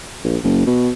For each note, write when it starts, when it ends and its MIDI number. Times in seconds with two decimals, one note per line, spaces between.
0.25 0.37 34
0.44 0.66 30
0.67 0.90 47